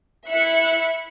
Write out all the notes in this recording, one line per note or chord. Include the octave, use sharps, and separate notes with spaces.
E4 E5 F#6 C#7